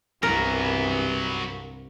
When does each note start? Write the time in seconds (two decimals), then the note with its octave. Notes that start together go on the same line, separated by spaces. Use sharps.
0.23 C2 G2 E3 F#3 B3 A#4